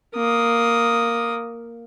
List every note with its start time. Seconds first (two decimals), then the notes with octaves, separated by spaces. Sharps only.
0.15 A#3 D#6